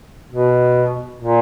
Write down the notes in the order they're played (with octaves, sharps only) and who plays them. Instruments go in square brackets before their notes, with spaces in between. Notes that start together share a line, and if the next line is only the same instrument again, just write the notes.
[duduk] B2
A#2